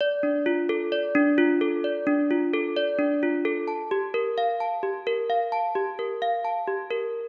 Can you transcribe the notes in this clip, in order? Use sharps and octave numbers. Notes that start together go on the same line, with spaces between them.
D5
D4
F4
A4
D5
D4
F4
A4
D5
D4
F4
A4
D5
D4
F4
A4
A5
G4
A#4
F5
A5
G4
A#4
F5
A5
G4
A#4
F5
A5
G4
A#4